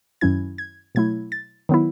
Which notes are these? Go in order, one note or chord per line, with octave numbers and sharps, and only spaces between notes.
F#2 D#3 F#3 C#4 E4 G#6
G#6
B2 F#3 A3 E4 G#6
A6
D#3 F#3 B3 E4